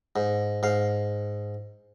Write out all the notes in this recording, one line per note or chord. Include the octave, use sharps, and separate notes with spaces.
G#2
G#2 F5